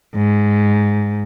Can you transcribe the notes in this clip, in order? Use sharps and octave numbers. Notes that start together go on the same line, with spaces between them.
G#2